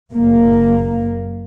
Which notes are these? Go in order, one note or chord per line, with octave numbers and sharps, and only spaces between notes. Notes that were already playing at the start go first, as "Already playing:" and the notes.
F#1 A#3